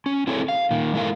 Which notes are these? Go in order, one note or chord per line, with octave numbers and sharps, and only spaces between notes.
C#4
C4 E4 G#4 A4 B4 C#5
F5
A#2 D#3
G#3 A3 E4 A#4 F5